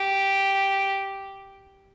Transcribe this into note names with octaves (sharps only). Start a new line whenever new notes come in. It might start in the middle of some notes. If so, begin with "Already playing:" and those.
Already playing: G4